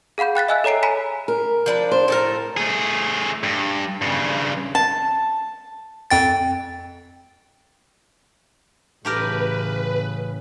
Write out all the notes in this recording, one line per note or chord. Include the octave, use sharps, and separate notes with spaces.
G#4 F5 F#5 B5 G6
G5 F#6 A6 B6
D#5 E5 G#5 E6 F#6
A4 C#5 A#5 C7 D7
G#5 A#5 B5 B6
A#4
F3 D4 B4
C5
A2 A4 A#4
A3 G#4
G2
G2 C#3
A5
F2 G5 A6
A1 C#3 A3 G4 A#4 B4